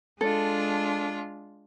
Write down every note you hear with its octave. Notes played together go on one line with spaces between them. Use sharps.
G#3 D4 F4 A4